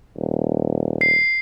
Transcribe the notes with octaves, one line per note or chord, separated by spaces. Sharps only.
D#1
C7